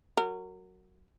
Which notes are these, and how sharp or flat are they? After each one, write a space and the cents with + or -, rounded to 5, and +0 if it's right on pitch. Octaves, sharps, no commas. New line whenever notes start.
F#3 +0 A#4 -25